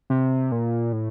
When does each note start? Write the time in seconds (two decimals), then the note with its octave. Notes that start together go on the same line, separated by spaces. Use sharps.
0.10 C3
0.52 A#2
0.93 A2